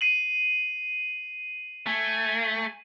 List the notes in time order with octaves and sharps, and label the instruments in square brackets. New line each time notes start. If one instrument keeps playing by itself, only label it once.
[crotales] C7 D#7 F#7
[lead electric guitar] A3 [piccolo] G#5